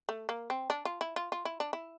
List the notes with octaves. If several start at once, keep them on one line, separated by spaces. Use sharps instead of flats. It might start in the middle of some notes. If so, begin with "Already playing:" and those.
A3
A#3
C4
D4
F4
E4
F4
F4
E4
D4
E4